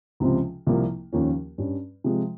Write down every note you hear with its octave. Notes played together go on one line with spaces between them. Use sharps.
C#2 C3 F3 C4 F4
C2 C3 F3 A#3
D#2 C#3 F3 A#3 C#4
G2 G3 C#4
C3 F3 G#3